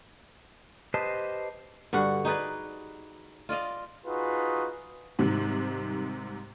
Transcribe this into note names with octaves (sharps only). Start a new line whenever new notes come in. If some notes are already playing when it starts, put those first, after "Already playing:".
G4 B4 C5 D#5 A5
G2 D3 F#4 F#5
D#4 G#4 B4 D5
F4 D5 D#5 F5
D#4 F4 F#4 G#4 B4
G#2 C3 D#3 G3